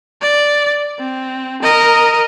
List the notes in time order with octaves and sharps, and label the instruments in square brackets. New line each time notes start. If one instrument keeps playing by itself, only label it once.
[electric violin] D5
C4
A#4 D#5